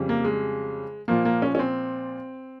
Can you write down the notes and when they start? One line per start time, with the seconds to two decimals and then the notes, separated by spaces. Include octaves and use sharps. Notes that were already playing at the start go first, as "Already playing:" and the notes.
Already playing: F2 C#3 G3
0.09 A#3
0.25 G#3
1.08 A#2 F3 A#3
1.25 A#3
1.42 C#4
1.55 C#4
1.59 C4